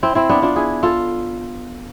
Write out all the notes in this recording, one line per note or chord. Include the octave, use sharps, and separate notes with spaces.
C4 E4
C4 E4
B3 D4
D4 F4
E4 G#4
F4 A4